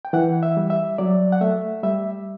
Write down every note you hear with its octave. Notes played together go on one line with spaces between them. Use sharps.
G5
E3 F#5
E5
G3
E5
F#3 D5
F#5
A3 E5
G3 E5